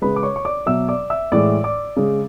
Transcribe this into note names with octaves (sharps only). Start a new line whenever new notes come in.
C#3 G#3 B4 B5
D6
C#5 C#6
C#6
D5 D6
B2 F#3 E5 E6
D5 D6
E5 E6
A2 E3 G#3 D5 D6
D5 D6
C#3 G#3